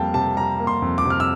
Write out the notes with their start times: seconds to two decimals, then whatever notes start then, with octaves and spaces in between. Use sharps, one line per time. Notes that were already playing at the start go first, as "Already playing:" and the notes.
Already playing: F2 G3 A#3 F5 G5 A5
0.14 C3 A5
0.37 G3 A#5
0.59 A#3
0.67 C6
0.82 F2
0.98 D6
1.05 C3
1.10 F6
1.20 E6